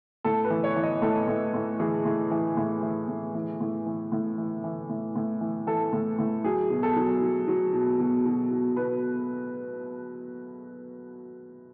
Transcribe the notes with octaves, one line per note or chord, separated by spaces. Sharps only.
A2 A4
B4
E3
C#5
E3
D#5
A2 A4
A2
A2
E3 G#4
A2
E3
A2
E3
A2
E3
A2
E3
A2
E3
E3
A2
A2
E3
E3 A4
A2
A2
F#3 G#4
B2
A4
F#3
F#3
F#3
B2
B2
B2
B2
B2 B4